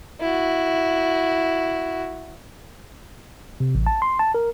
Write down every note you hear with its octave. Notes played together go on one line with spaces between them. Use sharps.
E4 F#4
C3
A1
A5
C6
A5
A#4